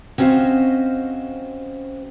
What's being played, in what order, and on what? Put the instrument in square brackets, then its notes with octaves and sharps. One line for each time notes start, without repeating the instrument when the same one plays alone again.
[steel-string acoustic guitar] C4 C#4 F#4 C5 D#5 F5